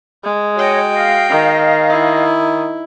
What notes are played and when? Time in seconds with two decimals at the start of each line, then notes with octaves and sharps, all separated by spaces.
0.24 G#3
0.56 F#4 C#5 D#5 G5
0.92 D#5 F5
1.30 D#3
1.90 E4